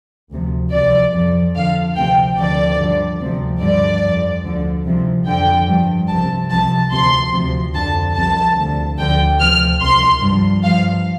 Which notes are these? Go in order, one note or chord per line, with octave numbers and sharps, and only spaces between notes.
D2 C3 F3
C2 C3 F3 D5
F2 F3
F2 D3 F3 F5
D2 C3 F3 G5
D2 D3 F3 D5
G2 D3 F3
D2 C3 F3
G2 D3 F3 D5
F2 F3
D2 D3 F3
C2 C3 F3
F2 D3 F3 G5
G2 F3
C2 C3 F3 A5
C2 C3 F3 A5
D2 C3 F3 C6
D2 C3 F3
F2 D3 F3 A5
C2 C3 F3 A5
D2 D3 F3
D2 D3 F3 G5
D2 C3 F3 F6
C2 C3 F3 C6
G2 F3
G2 F3 F5